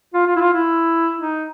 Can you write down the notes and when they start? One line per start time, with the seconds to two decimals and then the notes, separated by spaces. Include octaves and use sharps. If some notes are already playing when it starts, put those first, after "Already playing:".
0.14 F4
0.27 F4
0.36 E4
0.40 F4
0.53 E4
1.20 D#4